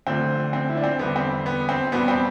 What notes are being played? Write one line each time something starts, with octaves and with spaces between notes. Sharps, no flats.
D2 D3 F3 C4
C4
E4
D4
C4
E2 D3 G3 B3
C4
B3
C4
E2 B2 G3 B3
C4